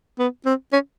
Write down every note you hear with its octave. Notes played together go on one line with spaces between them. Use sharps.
B3
C4
C#4